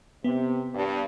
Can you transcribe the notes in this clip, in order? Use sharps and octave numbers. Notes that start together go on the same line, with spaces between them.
C3 B3
G2